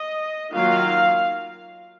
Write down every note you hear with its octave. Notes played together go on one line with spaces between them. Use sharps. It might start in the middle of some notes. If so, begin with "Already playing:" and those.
Already playing: D#5
D#3 F#3 A#3 F4 F5